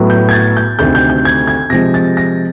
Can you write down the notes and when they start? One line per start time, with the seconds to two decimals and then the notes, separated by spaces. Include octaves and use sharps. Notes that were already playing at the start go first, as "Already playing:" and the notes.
Already playing: A2 F#3 B3
0.10 G6
0.29 G#6
0.33 A6
0.57 G6
0.79 D2 C3 D#3 G6
0.95 G6
1.10 G6
1.25 G#6
1.47 G#6
1.70 C3 F3 G#3 A#6
1.94 A6
2.17 A#6